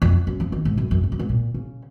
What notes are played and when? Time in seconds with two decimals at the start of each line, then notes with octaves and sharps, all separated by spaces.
0.02 F2
0.27 F#2
0.40 F3
0.52 D#3
0.65 G#2
0.77 F#2
0.91 F#2
1.03 G#2
1.12 F#2
1.19 G#2
1.29 A#2
1.54 C#3